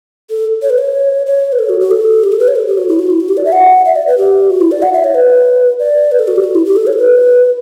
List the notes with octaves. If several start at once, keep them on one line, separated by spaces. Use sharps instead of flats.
A4
C#5
B4
C#5
C#5
B4
A4
F#4
F#4
A4
G4
A4
B4
C#5
A4
G4
F#4
E4
F#4
E4
F#4
G4
D5
E5
F#5
E5
D5
B4
G4
F#4
E4
D5
F#5
E5
C#5
B4
D5
B4
A4
F#4
G4
F#4
E4
G4
A4
C#5
A4
B4